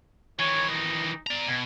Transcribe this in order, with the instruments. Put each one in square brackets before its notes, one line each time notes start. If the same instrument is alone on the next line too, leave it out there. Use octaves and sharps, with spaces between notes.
[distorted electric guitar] D#3 E3 [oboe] C#5
[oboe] D#4
[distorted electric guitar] D5 A#5
[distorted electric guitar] B2 [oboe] G#5